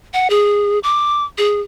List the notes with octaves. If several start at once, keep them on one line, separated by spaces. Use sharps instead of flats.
F#5
G#4
D6
G#4